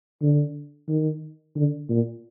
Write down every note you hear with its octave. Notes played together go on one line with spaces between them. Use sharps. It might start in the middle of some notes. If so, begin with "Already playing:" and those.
D3
D#3
D3
A#2